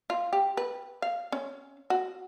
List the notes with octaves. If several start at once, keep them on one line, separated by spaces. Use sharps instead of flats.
F4
G4
B4
F5
C#4
F#4